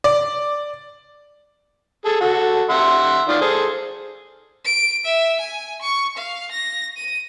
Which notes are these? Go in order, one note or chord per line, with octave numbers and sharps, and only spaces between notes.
D5
G#4 A4
F#4 A4
E5 F#5 C6
D#3 F4 D5
G#4 A4 C5
D7
E5
G#5
C#6
F5
A#6
D#7